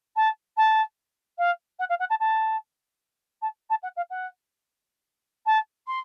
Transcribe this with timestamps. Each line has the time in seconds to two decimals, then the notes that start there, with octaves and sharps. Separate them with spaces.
0.16 A5
0.57 A5
1.38 F5
1.79 F#5
1.89 F5
1.99 F#5
2.10 A5
2.20 A5
3.42 A5
3.70 A5
3.83 F#5
3.96 F5
4.10 F#5
5.46 A5
5.87 C6